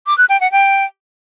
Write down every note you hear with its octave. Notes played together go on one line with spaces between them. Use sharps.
D6
F#6
G5
F#5
G5